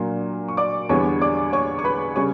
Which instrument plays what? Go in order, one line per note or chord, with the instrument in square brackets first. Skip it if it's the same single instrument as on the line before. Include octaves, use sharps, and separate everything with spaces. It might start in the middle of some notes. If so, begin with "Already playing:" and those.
Already playing: [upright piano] A#2 F#3 A#3 D4
C#6
D5 D6
E2 D3 G3 B3 C#5 C#6
D5 D6
C#5 C#6
C#6
B4 B5
C#3 G3 C#4 C#5 C#6